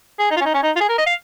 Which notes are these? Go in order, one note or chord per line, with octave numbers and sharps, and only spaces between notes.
G#4
D#4
F4
C#4
D#4
C#4
D#4
F4
G#4
A#4
D#5
F5